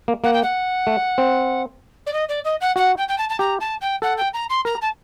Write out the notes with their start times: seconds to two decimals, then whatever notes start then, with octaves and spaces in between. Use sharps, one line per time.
0.08 A#3
0.23 A#3 F#5
0.33 G5
0.42 F#5
0.87 A3
1.18 C4
2.06 D5
2.13 D#5
2.28 D5
2.44 D#5
2.60 F#5
2.76 F#4 F#5
2.97 G5
3.08 G5
3.17 A5
3.29 A5
3.39 G4 A#5
3.60 A5
3.81 G5
4.02 A4 F#5
4.17 G5
4.33 A#5
4.49 C6
4.65 A#4 A#5
4.81 A5